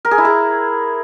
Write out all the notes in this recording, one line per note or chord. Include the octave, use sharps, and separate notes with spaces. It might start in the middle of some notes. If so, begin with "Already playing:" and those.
A#4
G#4
E4
G#4